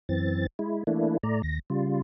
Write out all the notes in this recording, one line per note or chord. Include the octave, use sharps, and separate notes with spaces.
F#2 E3 C4 A6
G#3 E4
E3 A3 A#3 D4 E4
A2 A3 D5 A#5
D#2 A#6
C#3 G3 F4